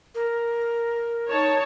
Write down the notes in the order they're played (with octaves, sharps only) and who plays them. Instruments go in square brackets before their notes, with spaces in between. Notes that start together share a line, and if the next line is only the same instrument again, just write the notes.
[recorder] A#4
[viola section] D#4 C#5 A5